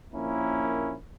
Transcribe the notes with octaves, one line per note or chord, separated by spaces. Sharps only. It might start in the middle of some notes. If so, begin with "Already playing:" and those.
A#1 A#3 C#4 E4 A#4